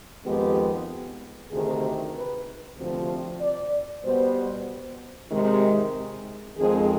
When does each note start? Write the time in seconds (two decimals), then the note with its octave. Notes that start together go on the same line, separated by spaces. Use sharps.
0.25 F2 D#3 G#3 B3 G4
1.51 D2 C3 D#3 G#4
2.14 B4
2.78 D2 C3 F3 C4
3.41 D5
4.04 B2 G3 B3 C5
5.31 C3 D#3 G#3
6.57 F2 D#3 G#3 C4 G#4